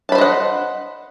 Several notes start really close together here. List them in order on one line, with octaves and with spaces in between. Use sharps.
A5 B5 C5 D#5 F#5